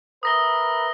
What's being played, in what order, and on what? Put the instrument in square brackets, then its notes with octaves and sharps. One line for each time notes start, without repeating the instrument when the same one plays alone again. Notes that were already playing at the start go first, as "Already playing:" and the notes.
[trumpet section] A#4 B4 E5 [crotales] D#6 A#6 G7